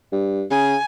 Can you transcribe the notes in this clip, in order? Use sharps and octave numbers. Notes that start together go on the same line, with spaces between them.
G2
C#3 G#5